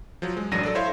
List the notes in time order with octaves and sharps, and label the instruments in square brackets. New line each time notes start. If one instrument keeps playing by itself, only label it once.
[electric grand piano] F3 F#3
G#3
A1 F#2 F#3 D4 A#6 D#7
A4 D5
E4 C5 C#5 E5 F5 C6